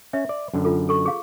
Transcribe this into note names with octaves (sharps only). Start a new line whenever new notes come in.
C#4 E5
D5
F#2 D3
F4 A4
A4 C#6
G#4 F5